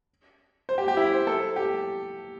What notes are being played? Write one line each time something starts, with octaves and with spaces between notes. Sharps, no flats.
C5
G4
G4
E4
C5
A4
G4